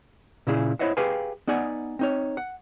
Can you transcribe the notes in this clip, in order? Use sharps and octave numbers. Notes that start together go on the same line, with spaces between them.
A#2 C#3 E4 G#4
E4 C5 C#5 D#5 E5 F#5
G4 G#4 B4 F5 G5 G#5
B3 D#4 D5 F#5 G#5
C4 D#4 C#5
F#5